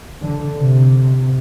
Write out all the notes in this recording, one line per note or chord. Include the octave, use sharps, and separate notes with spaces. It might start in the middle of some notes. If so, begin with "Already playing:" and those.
D3
C3